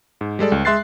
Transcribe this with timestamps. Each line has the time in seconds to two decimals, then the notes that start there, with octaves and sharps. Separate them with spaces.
0.21 G#2
0.39 G3 G#3 A4 D5
0.52 C#2
0.65 G#3 E5 C6 F#6 A6 C7